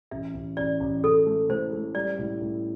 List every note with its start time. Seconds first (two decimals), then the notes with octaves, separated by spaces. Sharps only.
0.11 A1 E5
0.34 A1
0.57 A1 D5
0.80 A1
1.03 A1 A4
1.26 A3
1.49 A2 C5
1.72 A3
1.95 G3 D5
2.19 A2
2.41 A2